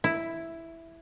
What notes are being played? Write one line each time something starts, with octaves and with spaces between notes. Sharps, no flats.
E4